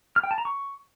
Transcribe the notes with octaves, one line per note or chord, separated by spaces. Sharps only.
F6
G5
A5
A#5
C#6